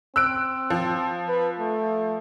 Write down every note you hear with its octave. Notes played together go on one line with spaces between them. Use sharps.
C4 E6 F#6 D7
F3
B4
A3